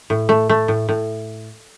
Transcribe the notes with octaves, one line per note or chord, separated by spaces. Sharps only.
A2
A3
A3
A2
A2